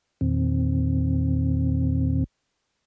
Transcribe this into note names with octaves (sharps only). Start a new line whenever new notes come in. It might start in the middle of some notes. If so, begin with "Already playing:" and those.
E2 A#2 D#3 C4